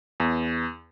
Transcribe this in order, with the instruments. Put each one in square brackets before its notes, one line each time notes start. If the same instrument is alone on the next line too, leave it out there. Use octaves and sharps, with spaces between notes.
[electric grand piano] E2